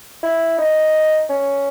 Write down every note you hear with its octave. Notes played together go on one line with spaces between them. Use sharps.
E4
D#4
C#4